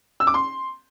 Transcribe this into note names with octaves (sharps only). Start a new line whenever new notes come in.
E6
D6
C6